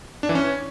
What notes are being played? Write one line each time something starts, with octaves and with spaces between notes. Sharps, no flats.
D4
E3
C#4